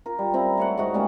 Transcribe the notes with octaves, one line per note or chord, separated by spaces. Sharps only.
F4 A#4
G3
C4 E4 A#5
A3 C#5 F#5
G#2 A3 D#4 F#4
C#3 G3 A#3 C#4